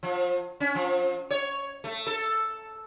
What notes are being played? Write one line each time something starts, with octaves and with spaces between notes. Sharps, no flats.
F3
C#4
F3
C#5
A3
A4